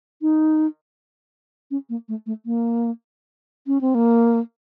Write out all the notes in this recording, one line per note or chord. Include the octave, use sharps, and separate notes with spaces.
D#4
C#4
A#3
A3
A3
A#3
C#4
C4
A#3